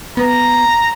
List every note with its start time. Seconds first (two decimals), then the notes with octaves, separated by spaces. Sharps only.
0.17 B3 A#5